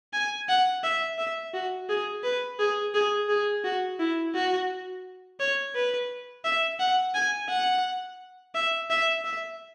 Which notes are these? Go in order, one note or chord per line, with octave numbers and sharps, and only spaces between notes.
G#5
F#5
E5
E5
F#4
G#4
B4
G#4
G#4
G#4
F#4
E4
F#4
C#5
B4
E5
F#5
G#5
F#5
E5
E5
E5